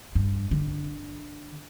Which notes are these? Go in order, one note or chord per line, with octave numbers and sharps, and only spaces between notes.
G2
D3